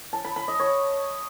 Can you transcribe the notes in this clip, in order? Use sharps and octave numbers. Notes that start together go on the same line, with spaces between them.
A5
B5
B5
D#5
C#5